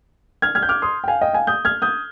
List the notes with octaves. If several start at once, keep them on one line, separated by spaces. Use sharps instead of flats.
F6 G#6
F6 G#6
G6
D6 F6
C6 D#6
G5
F5 G#5
D#5 G5
F5 G#5
D#6 G6
F6 G#6
D#6 G6